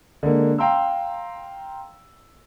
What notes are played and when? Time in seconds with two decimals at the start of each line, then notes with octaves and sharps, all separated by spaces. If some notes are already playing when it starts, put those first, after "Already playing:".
0.23 D3 G#3 A#3
0.58 F5 G5 A#5 C6 E6